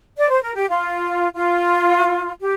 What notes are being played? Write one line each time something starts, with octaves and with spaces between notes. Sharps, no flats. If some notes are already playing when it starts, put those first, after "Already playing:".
D5
C5
A#4
G4
F4
F4
G4